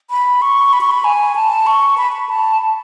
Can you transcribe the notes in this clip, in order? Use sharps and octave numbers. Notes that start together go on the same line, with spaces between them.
B5
C#6
B5
C#6
B5
G#5
A5
C#6
B5
B5
A5